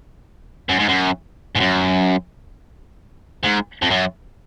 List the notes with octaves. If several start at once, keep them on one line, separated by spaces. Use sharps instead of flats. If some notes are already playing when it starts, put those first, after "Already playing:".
F#2
G#2
F#2
G#2
F#2
G#2
F2
F#2